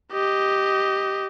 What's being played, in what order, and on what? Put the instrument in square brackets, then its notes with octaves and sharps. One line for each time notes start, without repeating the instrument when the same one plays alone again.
[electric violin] G4 D#5